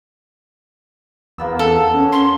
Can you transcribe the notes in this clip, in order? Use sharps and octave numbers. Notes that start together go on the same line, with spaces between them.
E2 A#3 B3 E6
A4 F#5
C#4
C6